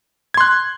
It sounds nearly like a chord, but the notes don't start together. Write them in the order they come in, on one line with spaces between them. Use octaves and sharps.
G#6 C6 F#6